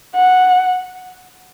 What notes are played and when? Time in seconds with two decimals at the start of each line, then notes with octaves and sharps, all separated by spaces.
0.15 F#5